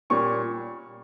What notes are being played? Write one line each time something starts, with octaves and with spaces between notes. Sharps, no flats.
A#2 G3 C#4 C#6